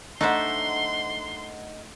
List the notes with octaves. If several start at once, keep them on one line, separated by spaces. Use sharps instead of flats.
A3 D4 D#4 C5 D#5 E5 F#5 C6